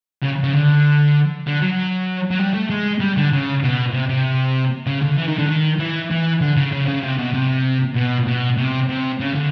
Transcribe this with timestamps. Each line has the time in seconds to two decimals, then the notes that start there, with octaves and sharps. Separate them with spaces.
0.23 C#3
0.44 C#3
0.53 D3
1.47 D3
1.62 F#3
2.31 F#3
2.39 G3
2.54 A3
2.70 G#3
3.00 G3
3.17 D3
3.32 C#3
3.63 B2
3.93 C3
4.09 C3
4.86 C#3
5.02 D3
5.17 E3
5.28 D#3
5.38 D3
5.48 D#3
5.79 E3
6.11 E3
6.41 D3
6.56 C#3
6.72 C#3
6.88 C#3
7.03 C3
7.18 B2
7.34 C3
7.95 B2
8.27 B2
8.57 C3
8.89 C3
9.20 C#3
9.35 D3